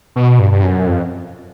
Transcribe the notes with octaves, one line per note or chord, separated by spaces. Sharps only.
B2
G2
G2
F#2
F2